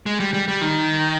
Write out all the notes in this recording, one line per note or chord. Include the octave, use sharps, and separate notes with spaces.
G#3
G3
G3
G3
D#3